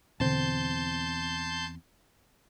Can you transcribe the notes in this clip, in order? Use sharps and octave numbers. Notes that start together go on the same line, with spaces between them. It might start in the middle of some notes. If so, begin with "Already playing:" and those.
E2 B2 D3 C4 A5 C6 G6